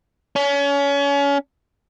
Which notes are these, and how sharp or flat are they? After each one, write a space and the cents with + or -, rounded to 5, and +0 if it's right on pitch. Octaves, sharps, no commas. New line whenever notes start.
C#4 +30